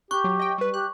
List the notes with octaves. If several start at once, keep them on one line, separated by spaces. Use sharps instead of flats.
G4 C#6 F#6 G6
F#3
D#5 G5
G3 B4
G4 F#6